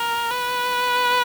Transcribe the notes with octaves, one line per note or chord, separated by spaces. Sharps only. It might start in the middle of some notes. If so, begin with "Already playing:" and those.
Already playing: A#4
B4